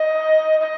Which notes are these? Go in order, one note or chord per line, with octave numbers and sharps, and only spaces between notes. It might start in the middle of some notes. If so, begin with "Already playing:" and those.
Already playing: D#5
D#5